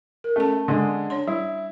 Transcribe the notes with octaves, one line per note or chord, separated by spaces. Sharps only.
A#4
A3 C#4 A5
D3 G#3 G#4
D4 C#5 C6
G3 E4